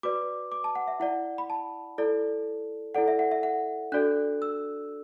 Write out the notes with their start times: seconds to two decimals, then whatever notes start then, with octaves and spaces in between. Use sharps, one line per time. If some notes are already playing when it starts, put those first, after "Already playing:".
0.03 F#4 B4 D5 D6
0.52 D6
0.64 A5
0.75 F#5
0.88 E5
1.00 E4 D5 F#5
1.38 B5
1.50 A5
1.98 E4 A4 D5
2.95 E4 A4 D5 F#5
3.08 E5
3.19 F#5
3.31 E5
3.43 F#5
3.92 D4 F#4 A4 D5 F#6
4.42 E6